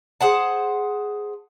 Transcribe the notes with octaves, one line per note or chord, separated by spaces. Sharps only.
G#4 C5 F#5 A5